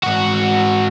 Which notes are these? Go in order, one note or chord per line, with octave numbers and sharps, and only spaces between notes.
G#2 F#4